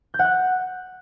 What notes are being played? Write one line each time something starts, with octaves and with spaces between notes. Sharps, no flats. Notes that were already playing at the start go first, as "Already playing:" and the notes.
G6
F#5
F#6